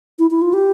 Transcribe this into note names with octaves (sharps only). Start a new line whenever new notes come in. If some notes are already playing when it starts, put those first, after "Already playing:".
E4
E4
F4
G4